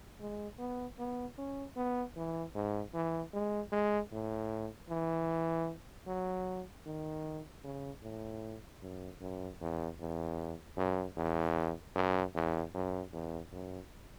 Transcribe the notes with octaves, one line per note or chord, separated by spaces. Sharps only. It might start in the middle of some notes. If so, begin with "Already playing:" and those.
G#3
B3
B3
C#4
B3
E3
G#2
E3
G#3
G#3
A2
E3
F#3
D#3
C#3
A2
F#2
F#2
E2
E2
F#2
E2
F#2
E2
F#2
E2
F#2